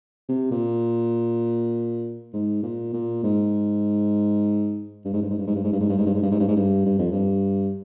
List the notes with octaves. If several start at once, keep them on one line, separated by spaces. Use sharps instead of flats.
C3
A#2
G#2
A#2
A#2
G#2
G2
G#2
G2
G#2
G2
G#2
G2
G#2
G2
G#2
G2
G#2
G2
G#2
G2
G#2
G2
G#2
G2
G2
F2
G2